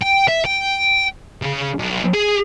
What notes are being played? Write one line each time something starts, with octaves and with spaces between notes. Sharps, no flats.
G5
E5
G5
C#3
B1
G#4